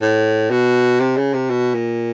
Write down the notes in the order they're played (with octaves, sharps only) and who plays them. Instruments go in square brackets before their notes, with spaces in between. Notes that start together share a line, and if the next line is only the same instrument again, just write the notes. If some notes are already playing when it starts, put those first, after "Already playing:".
[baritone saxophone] A2
B2
C3
C#3
C3
B2
A#2